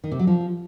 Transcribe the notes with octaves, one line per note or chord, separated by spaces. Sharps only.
D#3
C3
F#3
F3